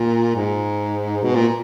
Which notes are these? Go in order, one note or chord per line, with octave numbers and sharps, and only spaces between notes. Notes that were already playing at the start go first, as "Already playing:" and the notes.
Already playing: A#2
G#2
B2
A#2